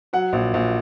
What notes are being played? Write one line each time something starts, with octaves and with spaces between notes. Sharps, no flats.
F#3 F#5
A#1
A#1